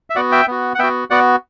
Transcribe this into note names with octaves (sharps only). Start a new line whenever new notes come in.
E5
B3 F#4 D5 F#5
E5 G5
B3 F#4
F#5
B3 F#4 E5 G5
B3 F#4 D5 F#5